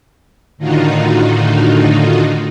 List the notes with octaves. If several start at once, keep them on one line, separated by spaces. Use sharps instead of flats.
A2 D3 D#3 D#4 F4 F#4